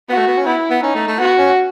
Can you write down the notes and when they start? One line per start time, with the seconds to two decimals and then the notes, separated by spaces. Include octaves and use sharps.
0.09 B3 F#4
0.18 A3
0.28 B3
0.37 C#4
0.46 B3 E4
0.71 B3
0.82 C#4 D#4
0.95 A3
1.08 A3
1.20 B3 F#4
1.38 C#4